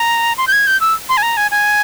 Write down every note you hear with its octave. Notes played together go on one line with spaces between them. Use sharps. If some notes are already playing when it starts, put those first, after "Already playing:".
Already playing: A#5
C6
G6
G#6
G6
E6
C6
G#5
A#5
G#5
G#5